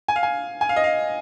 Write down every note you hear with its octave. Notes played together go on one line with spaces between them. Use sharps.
G#5
F5
G#5
G#5
F5
D#5
F5